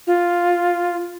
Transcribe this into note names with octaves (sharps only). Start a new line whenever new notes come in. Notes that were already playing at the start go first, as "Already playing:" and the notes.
F4